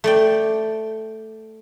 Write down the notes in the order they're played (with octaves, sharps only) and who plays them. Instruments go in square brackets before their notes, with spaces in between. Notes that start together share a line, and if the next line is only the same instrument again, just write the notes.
[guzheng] A3 D5 G5